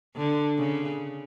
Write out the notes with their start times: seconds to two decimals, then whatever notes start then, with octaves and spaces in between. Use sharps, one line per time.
0.15 D3
0.58 C#3